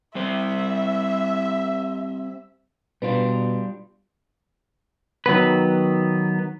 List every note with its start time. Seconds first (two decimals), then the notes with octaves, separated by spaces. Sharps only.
0.15 G3 C4 C5 E5
3.02 B2 G3 D4 F4 B4
5.26 D#3 F#3 B3 B4